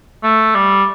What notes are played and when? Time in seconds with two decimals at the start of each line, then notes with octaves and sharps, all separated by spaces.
0.23 A3
0.55 G3